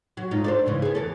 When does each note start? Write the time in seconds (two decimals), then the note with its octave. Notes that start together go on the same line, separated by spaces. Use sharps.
0.17 F#3
0.31 G#2 D#4 F4
0.44 D4 A4 C5
0.65 G#2 C#3 E3
0.82 B3 G#4
0.95 E2 E3 A4